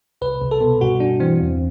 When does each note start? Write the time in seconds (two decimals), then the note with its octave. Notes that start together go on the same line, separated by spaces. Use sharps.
0.21 C2 B4
0.42 C2
0.51 A4
0.61 B2
0.81 G2 F#4
1.00 G2 D4
1.20 E3 C4
1.40 E2